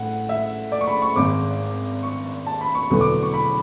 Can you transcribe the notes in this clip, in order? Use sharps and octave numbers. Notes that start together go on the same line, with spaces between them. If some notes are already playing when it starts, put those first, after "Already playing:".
Already playing: A1 A2 A3 F#5
E5
D5
C#6
B5
C#6
G#1 G#2 G#3 D6
C#6
A5
B5
C#6
E1 E2 D3 F#3 B3 C#6
D6
C#6
B5